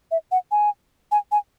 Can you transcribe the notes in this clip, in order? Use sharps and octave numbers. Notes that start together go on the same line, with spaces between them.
E5
F#5
G#5
G#5
G#5